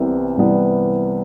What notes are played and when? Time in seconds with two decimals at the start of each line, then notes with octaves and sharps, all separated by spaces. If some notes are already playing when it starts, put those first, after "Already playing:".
Already playing: C2 C3 E3 G3 B3
0.37 C2 C3 E3 G3 B3